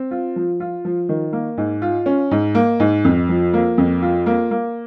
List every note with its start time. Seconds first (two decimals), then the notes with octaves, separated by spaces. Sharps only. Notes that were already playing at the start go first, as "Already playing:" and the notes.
Already playing: C4
0.11 F4
0.36 F3
0.60 F4
0.85 F3
1.09 D#3
1.33 A#3
1.57 G#2
1.82 F4
2.06 C#4
2.31 G#2
2.55 A#3
2.80 G#2
3.04 F2
3.29 F3
3.53 A#3
3.78 F2
4.02 F4
4.26 A#3
4.51 A#3